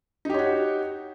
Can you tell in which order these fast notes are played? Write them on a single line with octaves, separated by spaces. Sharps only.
D#4 G4 C#5 F#4